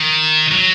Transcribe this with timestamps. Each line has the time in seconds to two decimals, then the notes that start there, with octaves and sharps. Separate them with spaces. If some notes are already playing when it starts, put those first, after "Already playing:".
Already playing: D#3
0.51 F#3